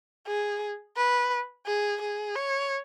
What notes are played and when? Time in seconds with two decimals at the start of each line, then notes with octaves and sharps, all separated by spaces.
0.27 G#4
0.97 B4
1.67 G#4
2.01 G#4
2.35 C#5